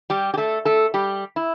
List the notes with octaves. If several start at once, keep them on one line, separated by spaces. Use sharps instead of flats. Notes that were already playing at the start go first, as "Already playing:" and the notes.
G3 G4
G4
A3 A4
A3 A4
G3 G4
E4